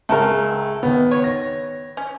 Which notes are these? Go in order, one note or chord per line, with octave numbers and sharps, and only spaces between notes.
C#2 G#3 A3 A4 A#4
D#3 B3
C#5
A#6
C#4